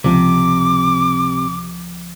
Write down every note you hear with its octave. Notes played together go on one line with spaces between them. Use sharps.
C#2 C3 F3 D6